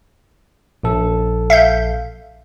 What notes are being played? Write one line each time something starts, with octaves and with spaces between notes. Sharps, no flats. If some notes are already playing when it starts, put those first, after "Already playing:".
A#1 A4
E5 F5 G6